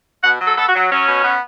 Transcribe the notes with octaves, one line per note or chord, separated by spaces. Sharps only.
B2 F#5
F#3
A4
B3 A4
F#4
F#3
F#3 C#4
B2
B3